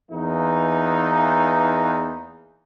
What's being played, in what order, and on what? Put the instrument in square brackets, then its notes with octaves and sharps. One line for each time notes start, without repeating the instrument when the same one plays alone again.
[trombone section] E2 E3 A#3 D#4